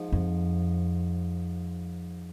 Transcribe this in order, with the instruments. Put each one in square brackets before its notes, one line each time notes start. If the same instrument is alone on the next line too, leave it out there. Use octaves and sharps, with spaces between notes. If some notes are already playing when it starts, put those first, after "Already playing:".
Already playing: [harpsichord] G#2 F3
[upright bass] F2